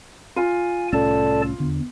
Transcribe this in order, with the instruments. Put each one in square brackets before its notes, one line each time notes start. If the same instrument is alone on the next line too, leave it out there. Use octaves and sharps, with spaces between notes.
[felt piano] F4 [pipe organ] G#5
[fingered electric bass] C2 A2 C#4 [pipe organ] A4 D5 A5
[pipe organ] E2 [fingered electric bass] D3